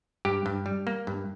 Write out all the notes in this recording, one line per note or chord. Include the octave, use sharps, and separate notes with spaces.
G2 G4
G2
G3
A#3
G2